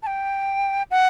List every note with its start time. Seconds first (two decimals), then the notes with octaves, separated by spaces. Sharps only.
0.03 A5
0.07 G5
0.91 F#5